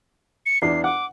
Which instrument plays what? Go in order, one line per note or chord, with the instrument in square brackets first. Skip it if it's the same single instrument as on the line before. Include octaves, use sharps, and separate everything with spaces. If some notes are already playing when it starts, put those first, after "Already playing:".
[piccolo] C#7
[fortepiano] E2 D4 [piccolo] C7
[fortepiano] F#5 [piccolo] D6